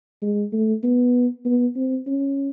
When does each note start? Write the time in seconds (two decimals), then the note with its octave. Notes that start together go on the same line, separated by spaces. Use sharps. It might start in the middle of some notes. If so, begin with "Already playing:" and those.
0.22 G#3
0.52 A3
0.84 B3
1.45 B3
1.76 C4
2.07 C#4